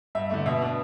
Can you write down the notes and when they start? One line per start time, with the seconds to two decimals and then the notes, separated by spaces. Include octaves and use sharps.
0.15 G2 E5
0.30 D3 A3 E5
0.46 B2 E5
0.62 B3 D4